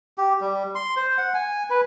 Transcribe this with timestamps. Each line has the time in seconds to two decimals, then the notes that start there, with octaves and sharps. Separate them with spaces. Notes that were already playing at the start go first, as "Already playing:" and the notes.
0.18 G4
0.41 G3
0.75 C6
0.96 C5
1.18 F#5
1.34 G#5
1.70 B4